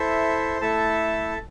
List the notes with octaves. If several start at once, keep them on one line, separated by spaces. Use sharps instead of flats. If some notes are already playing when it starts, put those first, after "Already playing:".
Already playing: E4 A4 C5 E5
A3 E4 A4 E5 A5